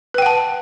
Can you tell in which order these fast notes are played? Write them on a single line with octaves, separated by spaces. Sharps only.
B4 G5 F#5 A5